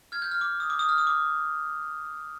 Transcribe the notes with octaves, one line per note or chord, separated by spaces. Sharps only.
F6 G#6
G6
F6
D6
D#6
D6
D#6
F6
D#6
D6